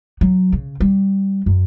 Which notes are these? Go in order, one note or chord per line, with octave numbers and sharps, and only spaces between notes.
F#3
C#3
G3
F#2